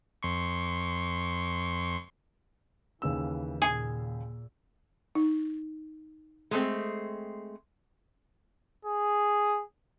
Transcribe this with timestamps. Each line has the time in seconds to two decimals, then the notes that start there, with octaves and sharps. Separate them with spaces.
0.23 F2 C6 C#6
3.02 D#2 C#3 E3 E6
3.62 A#2 G#4
5.15 D#4
6.51 G#3 A3 C4
8.85 G#4